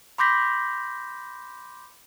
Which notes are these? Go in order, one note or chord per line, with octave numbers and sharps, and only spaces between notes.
B5 C6 D6 G6 A#6 B6